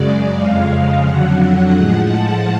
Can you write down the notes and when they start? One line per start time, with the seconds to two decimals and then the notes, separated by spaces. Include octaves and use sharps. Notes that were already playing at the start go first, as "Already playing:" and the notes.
Already playing: F#2 C#3 G#3 D5
0.38 F2 C#3 G#3 F5
1.07 F2 D3 F#3 F#5
1.75 A2 F3 G#3
2.09 A5